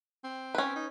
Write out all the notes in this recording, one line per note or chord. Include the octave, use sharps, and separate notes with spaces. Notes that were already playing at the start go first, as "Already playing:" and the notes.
C4
C#4 B4
D#4